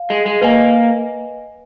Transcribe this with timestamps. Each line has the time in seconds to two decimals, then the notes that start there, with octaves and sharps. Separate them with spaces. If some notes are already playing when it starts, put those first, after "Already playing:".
Already playing: F5
0.10 G#3
0.26 G#3
0.41 A#3 B4 D#5 G#5